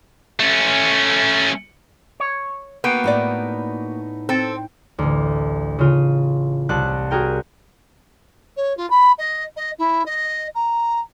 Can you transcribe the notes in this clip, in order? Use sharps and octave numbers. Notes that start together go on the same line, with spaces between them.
A3 C#4
C#5
A#3 B3 F#4 G5
A2 D#4 D5
C4 A4
A1 D2
C#3 F4 D#7
C2 A5 F#6
F#4 G#4 A#4 G5
C#5
F4
B5
D#5
D#5
E4
D#5
A#5